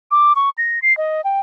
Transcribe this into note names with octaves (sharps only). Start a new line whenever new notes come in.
D6
C#6
A#6
C7
D#5
G5